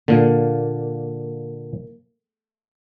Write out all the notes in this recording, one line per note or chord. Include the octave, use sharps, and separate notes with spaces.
A#2 D3 A#3